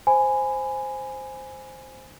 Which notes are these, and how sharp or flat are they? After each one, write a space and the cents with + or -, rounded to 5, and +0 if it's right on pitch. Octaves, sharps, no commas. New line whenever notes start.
C5 +0 G#5 +0 B5 +20